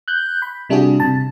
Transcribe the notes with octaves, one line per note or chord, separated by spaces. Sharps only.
F#6 G6
B5
C3 G3 D4 E4 F#4 G#4
C3 A5